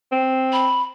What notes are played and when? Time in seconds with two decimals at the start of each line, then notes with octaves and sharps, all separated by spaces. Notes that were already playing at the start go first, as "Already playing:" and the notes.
0.12 C4
0.53 B5